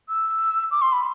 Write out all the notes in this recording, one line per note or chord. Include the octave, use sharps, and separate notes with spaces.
E6
D6
C6
B5